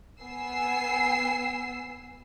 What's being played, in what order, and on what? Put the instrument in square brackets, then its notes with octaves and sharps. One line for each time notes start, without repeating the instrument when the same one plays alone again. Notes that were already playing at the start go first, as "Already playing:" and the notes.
[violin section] B3 G#5 E6 C7